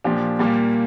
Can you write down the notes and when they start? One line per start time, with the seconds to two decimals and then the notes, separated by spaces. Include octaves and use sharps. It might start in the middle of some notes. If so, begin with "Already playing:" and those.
0.04 A#2 F3 D4 G4
0.39 A#2 G3 A#3 G4